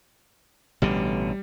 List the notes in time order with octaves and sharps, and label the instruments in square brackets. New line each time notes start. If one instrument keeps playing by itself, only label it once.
[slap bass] A1 B2 D3 [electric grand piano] G3